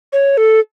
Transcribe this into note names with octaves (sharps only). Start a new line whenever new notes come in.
C#5
A4